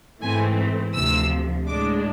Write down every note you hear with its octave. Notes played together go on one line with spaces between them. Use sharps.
G#2 E3 A3 C4 G#5
D2 C3 F3 E6
A2 G#3 D4 D6